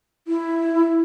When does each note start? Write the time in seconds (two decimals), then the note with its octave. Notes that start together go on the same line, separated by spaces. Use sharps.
0.28 E4